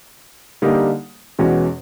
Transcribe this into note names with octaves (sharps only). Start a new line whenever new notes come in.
D3 G3 A#3 D#4 G4
E2 B2 G#3 C#4 F#4